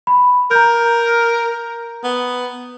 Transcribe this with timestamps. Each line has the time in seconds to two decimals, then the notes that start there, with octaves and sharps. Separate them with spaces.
0.07 B5
0.51 A#4 A#5 G6
2.04 B3